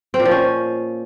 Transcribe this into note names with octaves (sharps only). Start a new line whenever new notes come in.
C4
A#2
F3
C#4